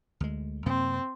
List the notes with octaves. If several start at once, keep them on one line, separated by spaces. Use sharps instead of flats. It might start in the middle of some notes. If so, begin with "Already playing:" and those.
D2 G#3
F#2 C3 A#3 C4